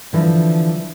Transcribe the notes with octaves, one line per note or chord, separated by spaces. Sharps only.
D3 E3 F3